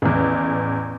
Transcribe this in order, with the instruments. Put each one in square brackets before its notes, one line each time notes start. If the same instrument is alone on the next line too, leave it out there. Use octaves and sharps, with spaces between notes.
[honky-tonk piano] A1 E2